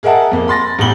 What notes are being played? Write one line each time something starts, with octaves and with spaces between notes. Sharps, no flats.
G#4 A#4 D#5 E5 F#5 A5
F2 A#3
B5 C6 A6 A#6
A1 E2 A2 G4 F#7 G7